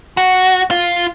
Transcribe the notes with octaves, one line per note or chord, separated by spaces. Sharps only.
F#4
F4